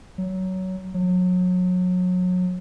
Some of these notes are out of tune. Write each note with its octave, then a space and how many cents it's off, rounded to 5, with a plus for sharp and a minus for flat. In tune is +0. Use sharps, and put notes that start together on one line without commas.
F#3 +15
F#3 -30